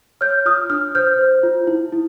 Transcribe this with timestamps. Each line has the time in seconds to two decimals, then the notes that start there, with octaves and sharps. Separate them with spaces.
0.21 C#5 F6 G6
0.45 F4 D#6 F6
0.70 D4 D#6 F6
0.95 C5 F6 G6
1.19 C5
1.43 F4
1.67 E4
1.92 E4